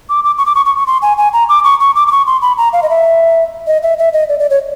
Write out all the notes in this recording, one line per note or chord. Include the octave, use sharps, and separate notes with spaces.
D6
D6
C#6
D6
C#6
C#6
C#6
C6
G#5
G#5
A#5
D6
C#6
C#6
D6
D6
C#6
C6
B5
A#5
F5
D#5
E5
D#5
E5
E5
D#5
D5
D5
C#5